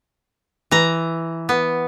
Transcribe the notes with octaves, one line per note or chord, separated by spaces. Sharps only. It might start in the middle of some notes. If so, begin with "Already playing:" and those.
E3 A#5
B3